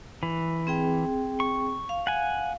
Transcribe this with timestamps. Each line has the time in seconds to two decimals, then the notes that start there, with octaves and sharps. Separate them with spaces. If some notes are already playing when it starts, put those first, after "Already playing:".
0.23 E3
0.67 C4 G#4 G5
1.40 C#6
1.89 F5
2.07 F#5 G#5